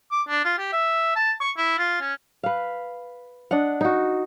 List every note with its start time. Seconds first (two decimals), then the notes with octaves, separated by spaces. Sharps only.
0.11 D6
0.28 D4
0.45 F4
0.58 G4
0.73 E5
1.16 A5
1.40 C#6
1.57 E4
1.79 F4
2.01 C#4
2.43 B4 F5
3.51 D4 D#5 F#5
3.81 D#4 F#4